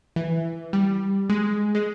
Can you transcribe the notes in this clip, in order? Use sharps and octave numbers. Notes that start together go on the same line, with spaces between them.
E3
G3
G#3
G#3